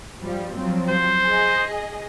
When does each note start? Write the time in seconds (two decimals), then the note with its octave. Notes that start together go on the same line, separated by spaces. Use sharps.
0.20 G2 F3 G3
0.55 F3 F#3 C4
0.90 C5
1.26 G#4 D#5